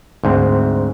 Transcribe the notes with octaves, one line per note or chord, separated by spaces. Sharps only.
D2 G#2 C4